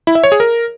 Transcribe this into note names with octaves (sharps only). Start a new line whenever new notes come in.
E4
E5
C#5
G#4
A#4